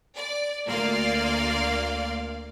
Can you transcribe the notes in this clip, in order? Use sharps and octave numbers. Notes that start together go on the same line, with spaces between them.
D5
D2 A#3 D5 F5 C6